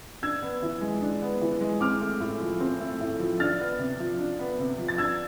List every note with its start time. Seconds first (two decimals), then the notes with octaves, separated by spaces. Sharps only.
0.22 D4 E6 G#6
0.42 B3
0.62 E3
0.81 G#3
1.01 D4
1.22 B3
1.41 E3
1.61 G#3
1.81 C4 D6 F6
2.01 A3
2.20 A2
2.40 F3
2.60 C4
2.80 A3
3.01 A2
3.20 F3
3.40 D4 F6 A6
3.60 B3
3.79 C3
3.99 F3
4.19 D4
4.39 B3
4.59 C3
4.78 F3
4.88 A6
4.98 D4 E6 G#6